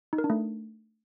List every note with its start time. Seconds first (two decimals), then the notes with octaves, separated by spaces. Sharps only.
0.13 D#4
0.18 A#4
0.24 D4
0.30 A3